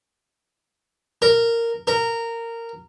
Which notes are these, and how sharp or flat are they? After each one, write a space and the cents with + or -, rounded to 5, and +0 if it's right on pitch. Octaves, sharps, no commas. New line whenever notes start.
A#4 -10
A#4 -15